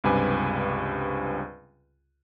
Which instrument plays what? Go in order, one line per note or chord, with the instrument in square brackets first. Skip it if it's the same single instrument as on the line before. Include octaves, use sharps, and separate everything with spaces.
[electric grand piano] C#2 G2 C3 B4 G#5 D6